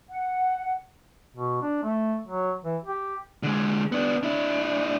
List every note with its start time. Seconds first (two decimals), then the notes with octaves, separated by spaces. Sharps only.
0.09 F#5
1.35 B2
1.62 D4
1.83 A3
2.28 F#3
2.64 E3
2.85 G4
3.43 D3 G#3
3.92 B3 D4
4.23 D4 E4